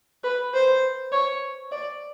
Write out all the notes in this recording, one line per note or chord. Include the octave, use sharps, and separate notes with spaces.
B4
C5
C#5
D5